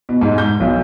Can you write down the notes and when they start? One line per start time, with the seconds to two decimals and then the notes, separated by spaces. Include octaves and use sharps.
0.09 B2
0.21 G#2
0.38 G6
0.60 B1